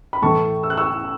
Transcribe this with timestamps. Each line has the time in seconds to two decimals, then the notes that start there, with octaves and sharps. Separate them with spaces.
0.13 B5
0.22 A2 E3 A3 A5 C#6
0.63 E6
0.70 F#6
0.77 C#6 E6